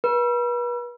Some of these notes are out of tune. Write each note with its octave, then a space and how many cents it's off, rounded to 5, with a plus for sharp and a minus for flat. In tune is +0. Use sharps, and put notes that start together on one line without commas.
B4 -40